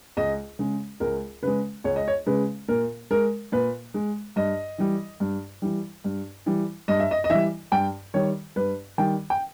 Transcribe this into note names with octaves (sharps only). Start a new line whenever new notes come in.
C#2 D#5
C#3 G#3
C#2 A#4
C#3 G#3 B4
C#2 C#5
D#5
C#5
C#3 G#3 B4
A#2 A#4
G#3 A#4
A#2 B4
G#3
G2 D#5
E3 G3
G2
E3 G3
G2
E3 G3
G2 D#5
E5
D#5
D#5
E3 G3 E5
G2 G5
D#3 G3 C#5
G2 B4
D#3 G3 G5
G5